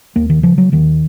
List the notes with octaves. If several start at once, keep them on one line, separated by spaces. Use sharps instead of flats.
D#2 A#3
D#3
C#3 F3
F#3
D#2 D#3